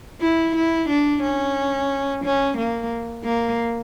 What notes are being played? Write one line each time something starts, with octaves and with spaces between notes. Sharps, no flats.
E4
E4
D4
C#4
C#4
A#3
A#3